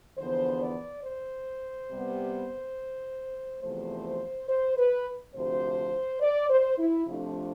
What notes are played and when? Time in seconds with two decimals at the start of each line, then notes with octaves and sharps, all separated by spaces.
0.17 E2 D3 F3 B3 C5
0.62 D5
1.04 C5
1.90 C3 G3 B3
3.62 E2 C3 F3 A3 C5
4.49 C5
4.77 B4
5.34 D2 C3 F3 C5
6.21 D5
6.50 C5
6.78 E4
7.06 F2 C3 F3 A3 D4 F4